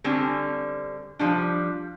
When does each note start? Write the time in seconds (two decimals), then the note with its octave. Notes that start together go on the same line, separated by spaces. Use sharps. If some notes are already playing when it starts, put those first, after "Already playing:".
0.04 D3 G3 C4 C#4
1.19 F3 G3 D4